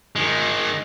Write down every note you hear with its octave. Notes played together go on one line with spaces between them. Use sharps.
D#3 G#3